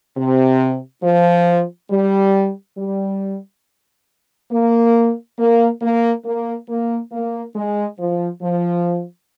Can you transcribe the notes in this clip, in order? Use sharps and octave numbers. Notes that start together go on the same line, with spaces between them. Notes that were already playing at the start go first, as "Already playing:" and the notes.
C3
F3
G3
G3
A#3
A#3
A#3
A#3
A#3
A#3
G#3
F3
F3